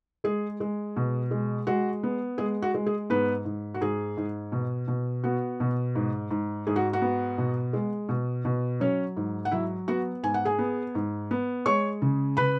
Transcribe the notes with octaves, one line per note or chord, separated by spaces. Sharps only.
G#3 G#4
G#3
B2
G#3
G#3 F#4
B3
G#3 G#4
F#4
G#3
G#4
G#2 B3 B4
G#2
F#4
G#2 G#4
G#2
B2
B2
B3 F#4
B2
G#2
G#2
G#2 G#4
F#4
F#4
B3
B2
G#3
B2
B2
F#3 C#4 C#5
G#2
F#5
F#3 E4 E5
B3 F#4 F#5
G#2 G#5
F#5
G#4 G#5
B3
G#2
B3
G#3 C#5 C#6
C#3
C#3 B4 B5